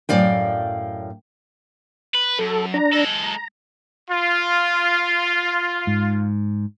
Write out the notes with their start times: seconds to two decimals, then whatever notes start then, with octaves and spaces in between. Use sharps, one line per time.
0.09 F#2 A2 D5 F5 G5
2.15 B4
2.39 F#2 A4
2.74 D4 A#5
2.93 G#3 A4
3.23 A#5
4.11 F4
5.87 G#2